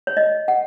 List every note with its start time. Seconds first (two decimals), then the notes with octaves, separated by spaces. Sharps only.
0.07 C#5
0.17 D#5
0.48 F#5